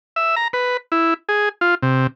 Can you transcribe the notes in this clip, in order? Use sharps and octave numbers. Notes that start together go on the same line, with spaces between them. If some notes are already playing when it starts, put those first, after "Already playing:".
E5
A#5
B4
E4
G#4
F4
C3